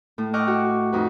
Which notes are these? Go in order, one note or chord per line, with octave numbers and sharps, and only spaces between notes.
A2
D#5 G5 C#6 D6 F6 F#6
F#4
F2 D#4 F#4 B4